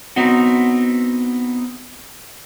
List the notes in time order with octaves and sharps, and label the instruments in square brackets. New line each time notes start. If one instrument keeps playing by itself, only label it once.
[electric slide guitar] B3 C4 D#4 F#4